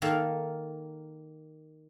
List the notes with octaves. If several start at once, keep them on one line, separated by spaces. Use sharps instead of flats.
D#3 A#3 A4 F5